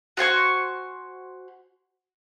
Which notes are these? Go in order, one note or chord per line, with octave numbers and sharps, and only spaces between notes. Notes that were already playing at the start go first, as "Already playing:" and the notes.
F#4 C5 G#5 C#6